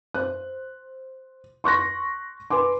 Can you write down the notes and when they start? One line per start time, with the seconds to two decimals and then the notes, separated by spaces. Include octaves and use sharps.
0.14 C5 F#6
1.64 C6 C#6 F#6 A#6
2.50 B4 G#5 C6 D6